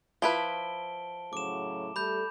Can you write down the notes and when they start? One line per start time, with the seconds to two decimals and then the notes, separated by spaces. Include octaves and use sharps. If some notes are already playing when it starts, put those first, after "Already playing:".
0.22 F3 E4 B4 A5 D7 G7
1.33 A2 C#3 F#3 D6 E7
1.96 G3 A3 A4 B5 G6